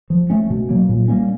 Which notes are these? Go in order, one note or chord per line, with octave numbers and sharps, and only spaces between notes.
F3
A3 C#4
B2
F#3 A#3
A#2
G3 A#3 C#4